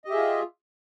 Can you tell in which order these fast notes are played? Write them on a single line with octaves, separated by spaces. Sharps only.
D#5 G4 E5 G#4 F4